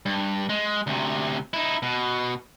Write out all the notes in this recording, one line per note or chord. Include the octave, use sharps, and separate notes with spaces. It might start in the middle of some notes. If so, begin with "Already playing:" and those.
G2
G#3
D2 C3
D#4 E4
B2